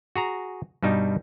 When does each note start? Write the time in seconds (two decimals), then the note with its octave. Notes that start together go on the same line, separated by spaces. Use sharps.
0.16 F#4 G#4 A#5
0.83 G2 B2 G3 D#4